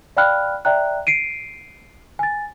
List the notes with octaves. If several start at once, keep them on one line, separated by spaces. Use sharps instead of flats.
D5 F5 G5 B5 F6 F#6
D5 E5 G5 A#5 F#6
C7 D7 D#7
G#5 A6